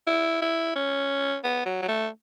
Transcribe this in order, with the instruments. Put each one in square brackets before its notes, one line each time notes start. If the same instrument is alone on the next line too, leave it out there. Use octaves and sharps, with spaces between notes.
[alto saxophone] E4
E4
C#4
B3
F#3
F#3
A3